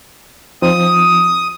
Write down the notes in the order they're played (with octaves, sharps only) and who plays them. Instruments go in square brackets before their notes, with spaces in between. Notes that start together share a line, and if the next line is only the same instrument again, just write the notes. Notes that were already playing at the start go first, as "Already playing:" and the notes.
[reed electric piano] F3 C4 D#4 [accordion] D#6